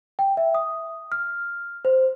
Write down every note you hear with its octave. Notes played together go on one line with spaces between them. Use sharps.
G5
E5
D#6
F6
C5